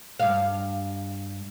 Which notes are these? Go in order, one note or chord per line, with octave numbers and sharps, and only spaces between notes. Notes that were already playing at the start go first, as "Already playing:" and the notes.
G2 F5